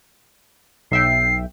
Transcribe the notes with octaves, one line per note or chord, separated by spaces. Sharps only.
B1 E5 G5 C7